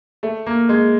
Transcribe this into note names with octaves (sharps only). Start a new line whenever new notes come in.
A3
A#3
G#3